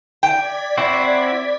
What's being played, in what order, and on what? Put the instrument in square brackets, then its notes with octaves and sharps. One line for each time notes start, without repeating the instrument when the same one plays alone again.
[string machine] D5 G#6 B6 [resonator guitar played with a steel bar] G5
[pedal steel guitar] C4 E4 F#4